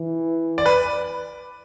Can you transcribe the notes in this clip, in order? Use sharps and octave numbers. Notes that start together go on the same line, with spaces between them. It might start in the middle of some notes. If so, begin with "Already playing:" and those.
Already playing: E3
D5
B4